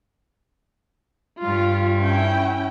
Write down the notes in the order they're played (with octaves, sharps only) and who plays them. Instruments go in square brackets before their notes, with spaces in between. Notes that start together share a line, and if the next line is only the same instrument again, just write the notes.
[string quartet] G2 [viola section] F4
[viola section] C#4 E4 G5